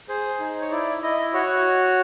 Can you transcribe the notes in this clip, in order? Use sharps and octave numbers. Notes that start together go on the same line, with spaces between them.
G#4 C5
D#4
C#5
E4 D5
E4 D#5
F#4 C#5